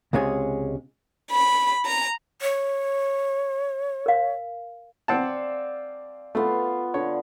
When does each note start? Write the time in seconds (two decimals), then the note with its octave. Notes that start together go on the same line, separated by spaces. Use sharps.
0.13 C#2 C3 G#3 C#4 G#4
1.31 B5
1.85 A#5
2.42 C#5
4.06 A#4 F5
5.08 C4 D5 F5 F#5 A5
6.35 A3 B3 F4 F5
6.94 D3 C#5